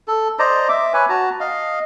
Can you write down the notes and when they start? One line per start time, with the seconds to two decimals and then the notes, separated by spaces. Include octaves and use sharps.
0.08 A4
0.39 C5 D5 D#5 A#5
0.69 E5 D6
0.93 B4 C#5 G#5
1.09 F#4 A5 A#5
1.40 D#5 F5